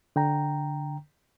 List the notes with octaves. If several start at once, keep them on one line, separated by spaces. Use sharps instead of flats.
D3 G5 A#5